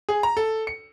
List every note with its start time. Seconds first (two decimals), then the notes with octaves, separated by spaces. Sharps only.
0.09 G#4
0.23 A#5
0.37 A4
0.67 C#7